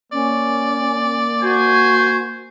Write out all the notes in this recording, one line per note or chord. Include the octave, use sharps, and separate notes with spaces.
A#3 C#4 D5
F#4 C5 G#5